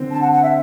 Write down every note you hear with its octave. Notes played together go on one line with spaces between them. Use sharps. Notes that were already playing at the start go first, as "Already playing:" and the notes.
Already playing: D3 C4
A5
F#5
F#5
E5